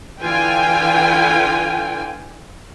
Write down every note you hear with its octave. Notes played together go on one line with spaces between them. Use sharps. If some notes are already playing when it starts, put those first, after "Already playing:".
D3 E3 F4 G5 G#5